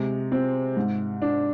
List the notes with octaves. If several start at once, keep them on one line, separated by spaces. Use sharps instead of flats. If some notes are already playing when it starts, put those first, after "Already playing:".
Already playing: C3 G#3
C4
G#2
D4